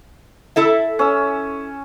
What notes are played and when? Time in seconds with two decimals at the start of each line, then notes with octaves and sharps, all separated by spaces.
0.56 E4 A4 E5
0.99 C#4 E6